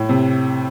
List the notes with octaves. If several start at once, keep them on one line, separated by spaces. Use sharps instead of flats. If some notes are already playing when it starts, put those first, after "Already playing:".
Already playing: A2
C3